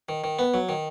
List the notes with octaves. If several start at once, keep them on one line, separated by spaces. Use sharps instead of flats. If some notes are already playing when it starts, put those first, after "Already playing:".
D#3
D#3
B3
F#3
D#3